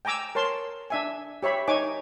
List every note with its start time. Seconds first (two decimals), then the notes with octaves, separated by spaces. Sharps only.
0.05 G5 G#5 A#5 D6 E6
0.35 A#4 C#5 A5 C6
0.90 D4 E5 G#5
1.43 G4 C#5 E5 B5
1.68 D#4 C#5 G#5 D6